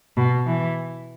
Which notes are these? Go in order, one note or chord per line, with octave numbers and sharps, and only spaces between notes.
B2
E3